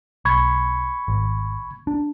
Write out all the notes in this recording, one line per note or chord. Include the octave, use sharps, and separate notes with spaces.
B1 B5 C#6 G#6
G#1
D4